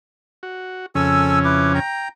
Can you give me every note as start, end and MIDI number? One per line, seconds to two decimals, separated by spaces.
0.43 0.86 66
0.95 1.80 41
0.95 1.80 49
0.95 1.80 61
0.95 1.39 69
0.95 1.39 80
0.95 1.39 88
1.45 1.73 64
1.45 1.73 71
1.45 1.73 86
1.75 2.08 79
1.75 2.08 82